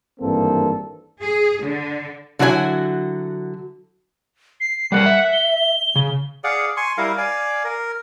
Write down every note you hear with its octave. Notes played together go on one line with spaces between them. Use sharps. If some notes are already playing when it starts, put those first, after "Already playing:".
G#1 G2 E3 A#3 C4 A4
G#4
D3
D3 F#3 E4 F#4 B4 G#5
C7
G3 A4 A#4 F#5
E5
G7
C#3
G#4 D5 F5 F#5
G#5 C6 C#6
G3 E4 A#4 F5
D5 F5 G#5
A#4